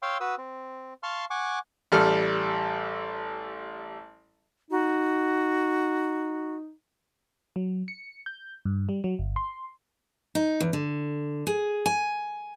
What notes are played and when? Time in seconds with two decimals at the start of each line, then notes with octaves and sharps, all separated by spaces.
0.02 C#5 F5 G5 C6 E6
0.20 F#4 B4 D#6 E6
0.38 C4
1.03 F5 A5 C6 C#6 F6
1.30 F#5 G#5 C#6 D6
1.92 A1 G3 A4 F6
4.71 D#4 F#4
7.56 F#3
7.88 C#7
8.26 G6
8.65 G2
8.89 G3
9.04 F#3
9.19 G1
9.36 C6
10.35 D#4
10.60 E2
10.73 D3
11.47 G#4
11.86 G#5